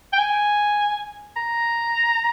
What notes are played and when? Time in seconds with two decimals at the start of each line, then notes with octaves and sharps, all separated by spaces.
0.13 G5
0.19 G#5
1.37 A#5